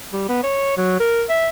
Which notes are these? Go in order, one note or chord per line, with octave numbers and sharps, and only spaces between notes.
G3
B3
C#5
F#3
A#4
E5